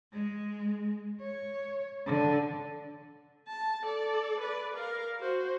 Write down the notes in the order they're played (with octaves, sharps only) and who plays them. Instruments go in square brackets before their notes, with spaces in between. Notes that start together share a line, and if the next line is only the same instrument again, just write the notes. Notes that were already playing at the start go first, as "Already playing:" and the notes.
[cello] G#3
C#5
D3
[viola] A5
A4 D5
B4 D5
A#4 F5
F#4 C5